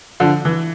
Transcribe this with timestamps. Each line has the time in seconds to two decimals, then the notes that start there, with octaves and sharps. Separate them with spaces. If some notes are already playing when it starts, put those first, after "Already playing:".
0.20 D3 F3
0.45 E3